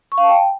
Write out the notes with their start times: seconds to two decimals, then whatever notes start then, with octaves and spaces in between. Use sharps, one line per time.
0.12 C#6
0.18 F5
0.24 A5
0.29 G5